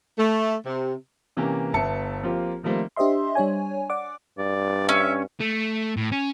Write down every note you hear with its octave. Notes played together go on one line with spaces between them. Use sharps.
A3
C3
C3 E3 A#3 C#4 G4
G1 B3 E5 A5 C#7
F3 A#3 C4 F4 G4
D#3 F3 G3 A3 A#3 C4
D4 G4 C5 D#5 E5 C6
G3 D4 C#5 G#5
D5 F#5 D6
G2 D5
C#4 E5
A3
A2
C#4